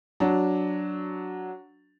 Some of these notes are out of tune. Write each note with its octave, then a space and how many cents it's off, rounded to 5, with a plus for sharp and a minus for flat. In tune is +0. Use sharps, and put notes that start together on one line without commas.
F#3 +0 D4 -5